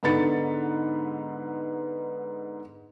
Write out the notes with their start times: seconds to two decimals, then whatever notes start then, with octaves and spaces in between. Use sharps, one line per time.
0.03 G#2 D3 B3 B5 A6 C#7